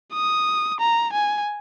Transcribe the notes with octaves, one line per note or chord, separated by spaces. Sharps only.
D#6
A#5
G#5